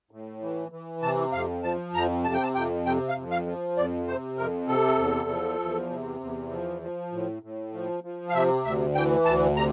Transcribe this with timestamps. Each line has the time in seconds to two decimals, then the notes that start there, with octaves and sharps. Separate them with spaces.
0.11 A2
0.42 E3
0.72 E3
1.02 C3 A5
1.33 F2 F5
1.63 F3 A5
1.93 F2 A#5
2.24 C3 A5
2.34 G5
2.43 A5
2.55 F2 G5
2.86 C3 G5
3.09 F5
3.16 F2
3.31 F5
3.47 F3
3.77 F2 D5
4.07 C3 C5
4.37 F2 A#4
4.68 C3 A4
4.99 E2
5.29 F3
5.60 E2
5.90 C3
6.20 E2
6.51 F3
6.82 F3
7.12 A2
7.43 A2
7.74 F3
8.04 F3
8.29 F5
8.34 C3 E5
8.65 D2 E5
8.95 E3 G5
9.25 D2 A5
9.56 C3 A#5